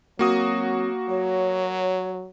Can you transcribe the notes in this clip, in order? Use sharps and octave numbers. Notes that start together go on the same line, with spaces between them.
F#3 A#3 C4 F#4 D#6
F#3 C#5